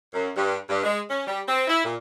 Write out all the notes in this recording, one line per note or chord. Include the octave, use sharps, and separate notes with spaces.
F#2
G2
G2
G#3
C#4
G3
C4
E4
A#2